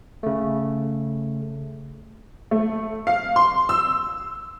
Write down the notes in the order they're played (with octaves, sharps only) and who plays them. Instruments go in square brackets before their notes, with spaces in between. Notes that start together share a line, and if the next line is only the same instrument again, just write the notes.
[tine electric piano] C#3 A3
[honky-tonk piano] A3
F5
C6
E6